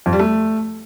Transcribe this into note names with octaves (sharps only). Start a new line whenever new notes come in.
F2
G3
A3